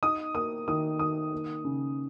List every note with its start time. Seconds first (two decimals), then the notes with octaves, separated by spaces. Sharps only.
0.03 D#4 D#6
0.35 A#3 D#6
0.68 D#3 D#6
0.99 D#3 D#6
1.32 A#3
1.64 C#3